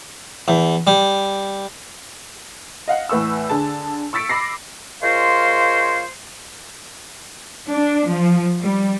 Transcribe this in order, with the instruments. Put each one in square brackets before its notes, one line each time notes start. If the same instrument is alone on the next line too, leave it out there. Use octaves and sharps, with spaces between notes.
[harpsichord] E2
G3
[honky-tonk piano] D#5 F5 F#5
E2 A2 B4 C#6 E6
D3 G#4 A5
C#6 E6 A6 B6 C#7 D7
B5 D6 A#6 C7
[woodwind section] G#3 F4 A#4 C5 C#5 F5
[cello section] D4
F3
G3